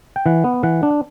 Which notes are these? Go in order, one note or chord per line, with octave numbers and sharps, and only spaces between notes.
G5
E3 F#5
B3
E3 F#5
D4